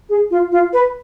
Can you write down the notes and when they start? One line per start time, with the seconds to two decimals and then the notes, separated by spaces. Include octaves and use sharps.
0.09 G#4
0.31 F4
0.52 F4
0.73 B4